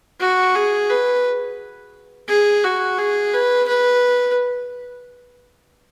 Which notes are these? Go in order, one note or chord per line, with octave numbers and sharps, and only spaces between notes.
F#4
G#4
B4
G#4
F#4
G#4
B4
B4